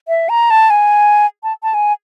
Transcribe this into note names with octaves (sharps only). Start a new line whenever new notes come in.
E5
A#5
A5
G#5
A5
A5
G#5